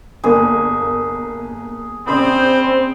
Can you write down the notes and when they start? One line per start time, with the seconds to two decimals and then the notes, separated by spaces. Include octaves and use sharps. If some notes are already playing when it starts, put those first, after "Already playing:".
0.24 G1 A#3 G#4
2.07 A#1 C4 C#4 C5 B5 D#6